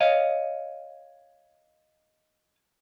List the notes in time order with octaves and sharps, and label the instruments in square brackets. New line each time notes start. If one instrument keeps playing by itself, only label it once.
[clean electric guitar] C#5 D#5 F5